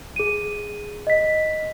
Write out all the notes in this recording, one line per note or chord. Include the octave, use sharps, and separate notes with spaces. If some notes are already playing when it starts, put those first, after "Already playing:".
G#4 D#7
D#5 B6